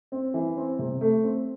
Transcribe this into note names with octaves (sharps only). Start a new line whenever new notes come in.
C4
E3
C4
C3
A3
C4